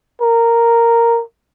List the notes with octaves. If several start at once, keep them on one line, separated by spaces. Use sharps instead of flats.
A#4